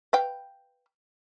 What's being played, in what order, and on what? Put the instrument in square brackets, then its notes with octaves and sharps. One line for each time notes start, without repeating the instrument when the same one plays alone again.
[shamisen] B4 F5 G5